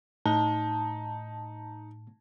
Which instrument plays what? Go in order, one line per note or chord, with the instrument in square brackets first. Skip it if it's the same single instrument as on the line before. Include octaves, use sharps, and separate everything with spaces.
[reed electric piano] A2 [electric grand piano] D#4 [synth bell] A5